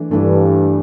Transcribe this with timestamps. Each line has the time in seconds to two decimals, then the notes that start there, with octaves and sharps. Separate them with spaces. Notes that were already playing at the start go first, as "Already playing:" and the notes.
Already playing: E3 A3 D4
0.11 G2 E3 A3 D4